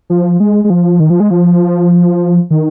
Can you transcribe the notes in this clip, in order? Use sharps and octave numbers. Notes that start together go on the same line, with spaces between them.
F3
G#3
G#3
F3
D#3
F3
G#3
F3
D#3